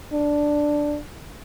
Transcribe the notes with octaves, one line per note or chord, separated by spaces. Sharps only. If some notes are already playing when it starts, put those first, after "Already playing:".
D4